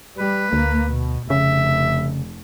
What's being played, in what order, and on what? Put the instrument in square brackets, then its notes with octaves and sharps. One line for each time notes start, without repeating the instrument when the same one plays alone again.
[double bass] G3 [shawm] B4
[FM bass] D2 [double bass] A#3
[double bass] B2
[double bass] F1 [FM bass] C#3 [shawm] E5